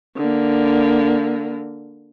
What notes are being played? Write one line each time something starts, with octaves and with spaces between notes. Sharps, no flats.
D3 A#3